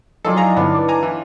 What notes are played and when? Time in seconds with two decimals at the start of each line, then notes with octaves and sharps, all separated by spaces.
0.25 F3 F#3 D#4 F4 G#4 A4 D5
0.37 E4 G#4 F5 G#5 A#5
0.56 G2 D3 B3 D4 E4 F4 C#5
0.74 B4 D6
0.88 G#5 A#5
1.03 E3